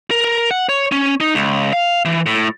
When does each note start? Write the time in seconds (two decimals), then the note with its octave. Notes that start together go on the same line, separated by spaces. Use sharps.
0.11 A#4
0.24 A#4
0.51 F#5
0.69 C#5
0.92 C#4
1.21 D#4
1.35 C#2
1.73 F5
2.05 E3
2.26 A2